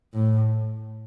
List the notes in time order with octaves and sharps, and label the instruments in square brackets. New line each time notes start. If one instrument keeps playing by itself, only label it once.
[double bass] A2